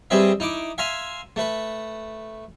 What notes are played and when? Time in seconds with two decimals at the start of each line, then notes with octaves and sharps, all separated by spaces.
0.10 G3 C4 G#4 B4 D#5 E5
0.40 D#4 E4 D6
0.78 E5 F5 G#5 A#5 C6
1.36 A3 B4